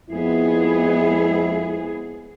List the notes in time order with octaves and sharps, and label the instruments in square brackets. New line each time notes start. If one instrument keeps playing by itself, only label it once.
[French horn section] F2 E4 [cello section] G#3 B3 G#4